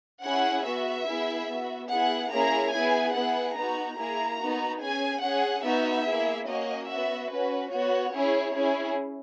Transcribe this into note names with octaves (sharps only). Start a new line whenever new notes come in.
C#4 E4 G#4 F#5
B3 F#4 E5
B3 E4 G#4
B3 F#4
B3 E4 G#4 F#5
A#3 C#4 E4 G#4 A#5
B3 E4 G#4 G#5
B3 E4 G#4 F#5
B3 D#4 F#4 A#5
A#3 E4 G#4 A#5
B3 D#4 F#4
C#4 G#4 G#5
C#4 G#4 F#5
B3 D#4 F#4 E5
A#3 E4 G#4
A#3 C#4 F#4 D#5
B3 F#4 E5
C#4 F#4 B4
B3 F#4 C#5
C#4 E4 G#4
C#4 E4 G#4